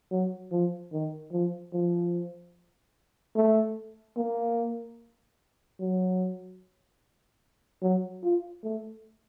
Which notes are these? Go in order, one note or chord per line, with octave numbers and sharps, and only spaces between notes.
F#3
F3
D#3
F3
F3
A3
A#3
F#3
F#3
F4
A3